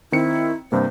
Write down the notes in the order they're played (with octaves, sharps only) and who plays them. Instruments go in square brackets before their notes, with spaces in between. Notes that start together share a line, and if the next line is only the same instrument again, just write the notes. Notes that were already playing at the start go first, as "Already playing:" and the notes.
[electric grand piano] D#3 C4 C#7 [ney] E4
[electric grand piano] G2 C3 A#3 [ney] C5